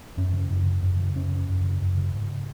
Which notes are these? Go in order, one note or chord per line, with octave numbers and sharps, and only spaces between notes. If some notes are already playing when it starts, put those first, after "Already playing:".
F#2 C#4
C#3
F#2
C#3
F#2
C#3
F#2 C#4
C#3
F#2
C#3
F#2
C#3
G#2